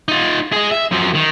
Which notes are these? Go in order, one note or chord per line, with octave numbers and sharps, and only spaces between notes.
D#4 F4
G#4 D#5
E5
F#2 F3
D#3